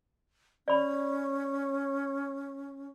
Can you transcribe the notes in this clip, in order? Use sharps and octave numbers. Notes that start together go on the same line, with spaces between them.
C#4 D5 B5